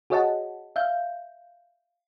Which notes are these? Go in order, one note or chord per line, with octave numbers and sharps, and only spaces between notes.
F#4 G#4 C#5 D#5 F#5 A5
E5 F5 G6